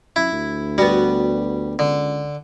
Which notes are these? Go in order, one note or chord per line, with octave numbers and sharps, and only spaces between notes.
F#2 E4
D2
G3 B3 F#4
C#2 D3